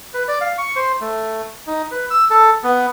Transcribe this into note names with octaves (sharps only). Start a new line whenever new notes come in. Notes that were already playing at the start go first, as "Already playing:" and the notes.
B4
D5
F5
C#6
C5
A3
D#4
B4
E6
A4
B3